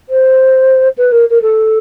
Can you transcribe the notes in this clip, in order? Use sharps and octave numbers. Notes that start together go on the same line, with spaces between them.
C5
B4
A#4
A#4
A4